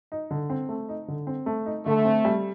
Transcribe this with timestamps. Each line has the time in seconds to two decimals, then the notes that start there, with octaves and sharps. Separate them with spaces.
0.12 D#4
0.31 D3
0.50 C4
0.69 A3
0.89 D#4
1.08 D3
1.27 C4
1.46 A3
1.66 D#4
1.86 D3 A3
2.05 C4
2.25 G3